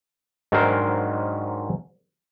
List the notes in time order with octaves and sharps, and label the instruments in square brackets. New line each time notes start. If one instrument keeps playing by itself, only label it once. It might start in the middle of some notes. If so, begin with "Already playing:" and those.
[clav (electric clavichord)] G#2 D#3 F#3 D4 A#4 C5